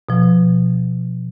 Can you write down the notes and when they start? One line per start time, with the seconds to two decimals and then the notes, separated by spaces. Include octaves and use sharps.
0.09 B2 F3